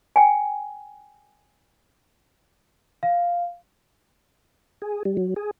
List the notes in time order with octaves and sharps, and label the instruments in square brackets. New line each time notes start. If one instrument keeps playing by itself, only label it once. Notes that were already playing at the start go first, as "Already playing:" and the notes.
[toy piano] G5 G#5
[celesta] F5
[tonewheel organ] G#4
G3
F#3
G#4